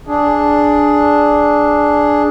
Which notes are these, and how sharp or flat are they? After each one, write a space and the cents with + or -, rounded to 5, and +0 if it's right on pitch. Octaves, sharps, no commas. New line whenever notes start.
D4 +0 G#4 +5